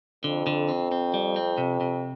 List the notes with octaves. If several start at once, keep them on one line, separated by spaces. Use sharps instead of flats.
F2 D3
D3
C4
C4
G3
C4
C3
C3